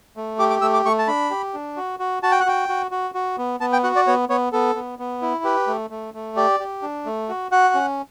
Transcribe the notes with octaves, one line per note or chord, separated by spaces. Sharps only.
A3
G4 D6
D6
A3 E6
D6
A3 C#6
A5
D4 B5
G4
D4
F#4
F#4
F#4 A5
G5
F#5
F#4 G5
F#4
F#4
F#4
B3
B3 A5
G5
F#4 F#5
D5
B3 C#5
B3 C#5
B3 A4
B3
B3
E4
G4 B4
A3
A3
A3
G4 D5
G4
D4
A3
F#4
F#4 F#5
C#4